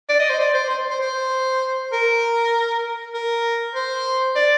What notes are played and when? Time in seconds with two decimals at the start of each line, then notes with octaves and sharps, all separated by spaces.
0.09 D5
0.19 D#5
0.29 C5
0.40 D5
0.54 C5
0.69 C5
0.90 C5
1.01 C5
1.92 A#4
3.14 A#4
3.75 C5
4.36 D5